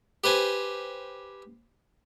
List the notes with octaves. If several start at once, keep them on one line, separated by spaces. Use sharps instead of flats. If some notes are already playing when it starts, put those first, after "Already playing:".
G4 B4 C5 G#5